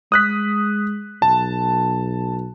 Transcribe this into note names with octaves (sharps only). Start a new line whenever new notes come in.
G#3 D#6 F#6 B6
B1 A5